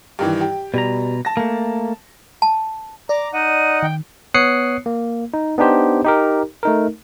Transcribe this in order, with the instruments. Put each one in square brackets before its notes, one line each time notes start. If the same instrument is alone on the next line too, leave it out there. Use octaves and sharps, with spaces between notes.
[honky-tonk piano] G2 D#3 E3
G4
[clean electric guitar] B2 A#5 [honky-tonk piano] G3
[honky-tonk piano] A5 A#6
[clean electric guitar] A3 A#3
[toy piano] A5
[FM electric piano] D5 [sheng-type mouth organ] A#5 [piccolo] D6
[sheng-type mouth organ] D#4 D#5 F#5 [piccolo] D#7
[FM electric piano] D#3 [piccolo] G5
[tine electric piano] B3 C#5 D#6 F#6 C7 C#7
A#3
D#4
B3 D4 D#4 G4 C5
D#4 G4 A#4
A3 D#4 A#4